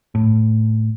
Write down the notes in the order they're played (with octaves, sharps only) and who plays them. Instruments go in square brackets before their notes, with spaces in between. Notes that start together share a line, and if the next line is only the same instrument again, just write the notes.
[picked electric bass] A2